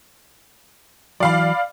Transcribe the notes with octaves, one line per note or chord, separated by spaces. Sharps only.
E3 F#3 D5 F5 B5